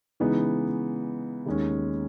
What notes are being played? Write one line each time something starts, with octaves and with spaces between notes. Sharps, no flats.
C#3 E3 G#3 B3 D#4
D#2 D#3 G#3 C#4